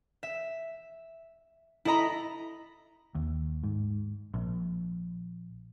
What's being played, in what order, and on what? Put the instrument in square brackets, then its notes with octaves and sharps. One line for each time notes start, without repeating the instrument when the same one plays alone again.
[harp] E5
E4 A4 D#5 A#5 B5
[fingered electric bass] D#2
G#2
A#1